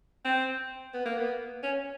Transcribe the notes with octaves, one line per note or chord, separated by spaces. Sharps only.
C4
B3
A#3
B3
C#4